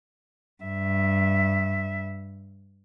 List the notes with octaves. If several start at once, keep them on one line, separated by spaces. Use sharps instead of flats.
G2 E5